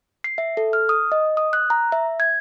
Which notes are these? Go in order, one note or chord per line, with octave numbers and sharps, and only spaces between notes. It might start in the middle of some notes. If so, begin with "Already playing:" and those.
C7
E5
A4
F6
D#6
D#5
D#6
F#6
A#5
E5
G#6